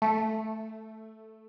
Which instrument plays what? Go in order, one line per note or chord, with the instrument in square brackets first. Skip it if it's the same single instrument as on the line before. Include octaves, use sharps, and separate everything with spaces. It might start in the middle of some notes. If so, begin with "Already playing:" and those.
[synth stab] A3